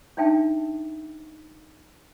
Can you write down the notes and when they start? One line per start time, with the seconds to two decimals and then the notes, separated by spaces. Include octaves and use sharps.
0.17 D4 D#4 E5 G5 A5